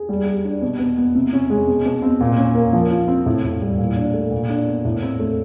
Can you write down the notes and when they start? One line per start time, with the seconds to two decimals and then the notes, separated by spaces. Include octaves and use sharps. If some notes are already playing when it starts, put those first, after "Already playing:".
Already playing: G#4
0.09 G3
0.26 G4
0.45 D4
0.62 B2
0.79 B2
0.97 B3
1.15 C3
1.33 C#4
1.50 G#3
1.68 B2
1.86 B2
2.02 C4
2.21 A#2
2.38 C#4
2.55 A#3
2.73 F3
2.91 F4
3.08 C4
3.26 A2
3.44 A2
3.61 G3
3.78 A#2
3.96 D4
4.14 A3
4.31 A#2
4.50 D4
4.67 B3
4.85 A2
5.03 C4
5.19 A3